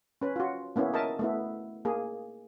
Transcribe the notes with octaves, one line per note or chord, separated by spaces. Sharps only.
C#4 B4
F4 F#4
A#3 B3 C#4 E4
A#4 D#5 E5 A5
A3 B3 E4
A#3 G#4